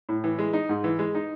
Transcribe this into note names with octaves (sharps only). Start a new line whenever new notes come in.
A2
E3
G#3
D#4
G#2
E3
G#3
D#4